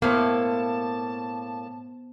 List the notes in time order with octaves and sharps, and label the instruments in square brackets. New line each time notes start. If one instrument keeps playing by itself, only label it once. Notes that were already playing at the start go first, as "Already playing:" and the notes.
[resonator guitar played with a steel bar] A2 A#3 [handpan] B3 C5 [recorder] A5